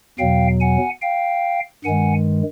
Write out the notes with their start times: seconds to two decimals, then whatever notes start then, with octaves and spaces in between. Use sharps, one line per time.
0.19 E2 B2 F#3 F5 G5
0.60 F#5 G#5
1.02 F5 G5
1.84 G2 D#3 G#3 F#5 G#5